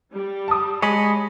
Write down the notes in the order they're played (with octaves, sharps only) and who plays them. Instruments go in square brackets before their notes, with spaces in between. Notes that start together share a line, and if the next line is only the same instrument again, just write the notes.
[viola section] G3
[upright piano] A5 D#6
[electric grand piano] G#3 G#5 [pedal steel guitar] C#5 D#5 B5